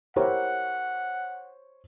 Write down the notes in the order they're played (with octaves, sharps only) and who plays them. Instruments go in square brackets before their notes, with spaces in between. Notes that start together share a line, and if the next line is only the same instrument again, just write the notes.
[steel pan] E4 G4 A#4 [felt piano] C5 C#5 [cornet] F#5